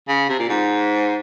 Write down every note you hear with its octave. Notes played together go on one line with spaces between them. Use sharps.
C#3
C3
A#2
G#2